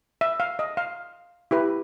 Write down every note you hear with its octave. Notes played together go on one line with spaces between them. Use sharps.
E5
F5
D#5
F5
E4 G4 B4